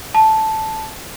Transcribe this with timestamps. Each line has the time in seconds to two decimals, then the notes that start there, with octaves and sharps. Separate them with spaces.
0.15 A5